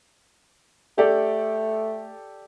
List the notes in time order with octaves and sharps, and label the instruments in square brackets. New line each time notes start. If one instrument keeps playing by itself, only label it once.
[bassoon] A3 [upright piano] G4 A4 D5